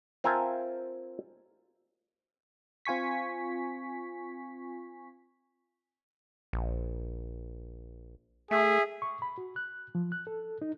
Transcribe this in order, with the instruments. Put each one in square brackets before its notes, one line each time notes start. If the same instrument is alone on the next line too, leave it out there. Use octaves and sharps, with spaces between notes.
[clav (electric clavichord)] C4 F4 A#4 E5 G#5 A5
[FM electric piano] C4 F4 G#5 C#6 B6
[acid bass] A#1
[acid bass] A3 [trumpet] G#4 [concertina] E5
[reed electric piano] C#6
B5
F#4
F#6
F3
F#6
A4
D#4